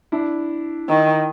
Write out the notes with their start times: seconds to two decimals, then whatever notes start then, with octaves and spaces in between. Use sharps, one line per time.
0.12 D4 E4
0.89 D#3